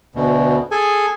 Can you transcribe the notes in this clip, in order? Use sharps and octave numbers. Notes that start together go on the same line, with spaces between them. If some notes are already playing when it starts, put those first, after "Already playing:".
D2 B2
G#4 A4 G#5